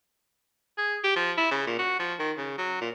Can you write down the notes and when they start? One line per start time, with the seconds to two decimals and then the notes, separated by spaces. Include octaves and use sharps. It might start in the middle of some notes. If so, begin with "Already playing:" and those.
0.78 G#4
1.04 G4
1.16 F3
1.38 E4
1.51 C#3
1.67 A#2
1.78 F#4
1.99 F3
2.19 D#3
2.37 C#3
2.58 F#3
2.81 A#2